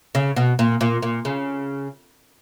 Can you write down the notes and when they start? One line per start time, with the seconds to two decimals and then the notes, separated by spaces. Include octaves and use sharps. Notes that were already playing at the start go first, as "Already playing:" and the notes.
0.15 C#3
0.36 B2
0.59 A#2
0.81 A#2
1.02 A#2
1.25 C#3